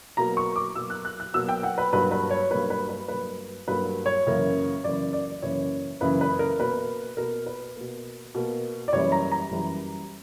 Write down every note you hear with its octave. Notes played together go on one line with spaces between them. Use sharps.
B2 F#3 A#3 A#5
C#6
D6
B2 F#3 A#3 E6
F#6
F#6
F#6
B2 F#3 A#3 E6
G5
F#5
B4
G2 F#3 A#3 B4
B4
C#5
G2 F#3 A#3 B4
B4
B4
G2 F#3 A#3 B4
G2 F#3 A#3 B4
C#5
F#2 C#3 E3 A#3
F#2 C#3 E3 A#3 D5
D5
F#2 C#3 E3 A#3 C#5
F#2 C#3 E3 A#3 B4
B4
A#4
B2 A#3 B4
B2 A#3 A#4
B4
B2 A#3
B2 A#3
D5
F#2 E3 G3 A#3 C#5
A#5
A#5
F#2 E3 G3 A#3